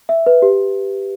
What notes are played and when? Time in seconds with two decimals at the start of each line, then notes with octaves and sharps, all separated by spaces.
0.09 E5
0.26 B4
0.42 G4